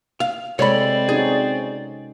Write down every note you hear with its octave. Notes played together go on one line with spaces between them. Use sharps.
F5
C3 G#3 C4 A4 C#5 D5 B5
C#4 D#4 F#4 G#4